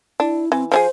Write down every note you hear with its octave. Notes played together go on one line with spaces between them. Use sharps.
D4 E4
E3 C4
F3 D4 G#4 C5